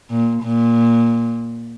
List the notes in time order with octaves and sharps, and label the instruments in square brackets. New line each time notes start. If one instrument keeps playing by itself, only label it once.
[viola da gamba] A#2
A#2